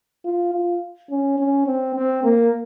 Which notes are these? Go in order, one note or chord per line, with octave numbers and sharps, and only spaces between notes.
F4
F4
C#4
C#4
C4
C4
A#3